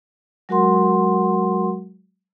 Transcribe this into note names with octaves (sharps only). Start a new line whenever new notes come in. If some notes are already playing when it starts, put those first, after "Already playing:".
F#3 G#3 F#4 A#4 F#5 C6